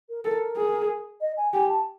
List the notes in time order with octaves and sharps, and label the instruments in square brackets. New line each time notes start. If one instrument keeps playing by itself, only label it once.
[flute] A#4
[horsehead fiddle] A4 [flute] A#4
[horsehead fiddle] G#4
[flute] D#5
G#5
[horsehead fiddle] G4 [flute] G#5
[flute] A5